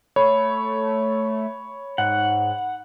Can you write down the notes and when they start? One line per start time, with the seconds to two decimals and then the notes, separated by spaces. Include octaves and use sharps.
0.16 A3 C#5 B5
1.98 G#2 F#5